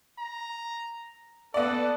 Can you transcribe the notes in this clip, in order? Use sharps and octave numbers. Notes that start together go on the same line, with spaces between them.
A#5
B3 A4 D5